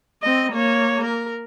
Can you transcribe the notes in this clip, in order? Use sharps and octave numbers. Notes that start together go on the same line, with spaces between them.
C4 D#5
A#3 C#5
A#4